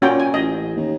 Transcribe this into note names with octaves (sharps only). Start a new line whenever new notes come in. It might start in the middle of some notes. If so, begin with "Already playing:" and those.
A#2 C#4 F#4 G5
G#5
A1 D#5
D#2